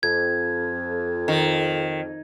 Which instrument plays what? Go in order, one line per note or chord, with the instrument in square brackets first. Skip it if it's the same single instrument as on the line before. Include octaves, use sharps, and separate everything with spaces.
[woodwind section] F2 [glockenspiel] G#6
[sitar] D#3